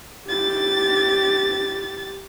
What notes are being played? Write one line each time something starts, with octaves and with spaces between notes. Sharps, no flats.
G4 A6